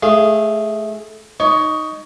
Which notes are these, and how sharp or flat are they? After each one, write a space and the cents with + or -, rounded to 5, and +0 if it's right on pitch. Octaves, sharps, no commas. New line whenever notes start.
A3 -20 G#4 +0 F5 -35
D#4 +0 C#5 +15 C#6 -45